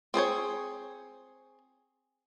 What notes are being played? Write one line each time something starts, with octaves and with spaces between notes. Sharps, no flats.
C4 G#4 C5 C#5